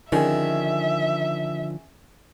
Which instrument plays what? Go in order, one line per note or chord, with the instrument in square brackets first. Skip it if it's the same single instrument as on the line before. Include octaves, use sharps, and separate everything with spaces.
[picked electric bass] D3 F3 [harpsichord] D#3 [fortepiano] C#4 G#4 [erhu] E5